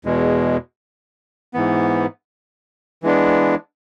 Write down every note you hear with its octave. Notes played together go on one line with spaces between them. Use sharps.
E2 B2 G#3
G#2 E3 B3
E3 G#3 B3 D4